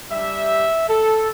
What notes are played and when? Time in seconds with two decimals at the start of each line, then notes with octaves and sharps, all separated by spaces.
0.10 G3 D4 G4 E5
0.88 A4